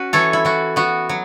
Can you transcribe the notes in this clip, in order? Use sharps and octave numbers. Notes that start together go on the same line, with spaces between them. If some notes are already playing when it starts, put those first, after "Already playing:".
Already playing: C#4 F#4 B4
E3 A4 C#5
E4
E3 F#4
B3 F#4
F#3